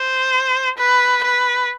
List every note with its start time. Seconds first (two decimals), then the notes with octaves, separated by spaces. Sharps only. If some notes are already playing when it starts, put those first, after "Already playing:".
Already playing: C5
0.78 B4
1.24 B4